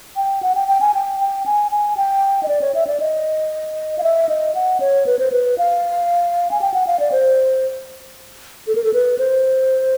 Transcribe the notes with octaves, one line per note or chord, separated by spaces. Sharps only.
G5
F#5
G5
G5
G#5
G5
G5
G#5
G#5
G5
D#5
D5
C#5
E5
D5
D#5
F5
E5
D#5
F#5
C#5
B4
C5
B4
F5
G#5
G5
F#5
F5
D5
C5
A4
A#4
A4
B4
C5